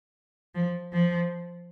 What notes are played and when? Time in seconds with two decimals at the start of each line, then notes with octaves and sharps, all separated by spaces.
0.55 F3
0.93 F3